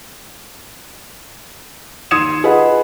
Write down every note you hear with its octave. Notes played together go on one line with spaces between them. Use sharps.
D#2 C6 D#6 G#6 C#7 E7
F4 G#4 B4 D#5 F#5 B5